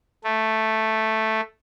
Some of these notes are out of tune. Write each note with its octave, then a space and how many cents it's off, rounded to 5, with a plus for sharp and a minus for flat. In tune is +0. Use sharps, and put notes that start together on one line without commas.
A3 +0